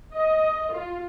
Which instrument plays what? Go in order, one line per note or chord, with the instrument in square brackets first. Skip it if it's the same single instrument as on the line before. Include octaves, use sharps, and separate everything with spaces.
[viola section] D#5
F4